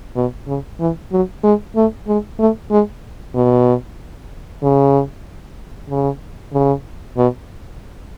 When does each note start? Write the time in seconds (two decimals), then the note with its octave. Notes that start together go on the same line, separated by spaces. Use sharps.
0.16 B2
0.47 C#3
0.80 E3
1.12 F#3
1.44 G#3
1.76 A3
2.07 G#3
2.39 A3
2.71 G#3
3.35 B2
4.62 C#3
5.90 C#3
6.53 C#3
7.17 B2